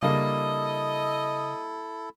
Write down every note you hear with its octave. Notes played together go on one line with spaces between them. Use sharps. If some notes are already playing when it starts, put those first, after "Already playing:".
C#3 G3 A#3 D4 E4 A4 D#5